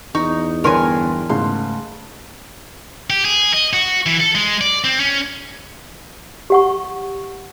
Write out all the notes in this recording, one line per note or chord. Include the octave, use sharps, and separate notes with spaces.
E2 D#4 C#6
G2 D3 B3 A#4 C#5 G#5 C6
G#2 C#3 A3 C6
G4
G#4
D#5
F#4
E3
A4
G#3
D5
C4
C#4
G4 F#5 C#6